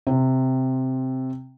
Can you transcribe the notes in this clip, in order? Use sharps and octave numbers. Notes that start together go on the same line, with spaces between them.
C3 C4